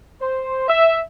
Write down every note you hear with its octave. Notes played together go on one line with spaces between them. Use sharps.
C5
E5